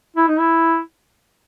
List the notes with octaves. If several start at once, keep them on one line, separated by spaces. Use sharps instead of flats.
E4
D#4
E4